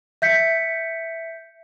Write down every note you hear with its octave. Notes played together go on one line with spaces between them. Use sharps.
E5 G6 B6 C#7